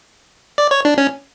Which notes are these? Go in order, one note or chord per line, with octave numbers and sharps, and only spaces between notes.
D5
C#5
D4
C#4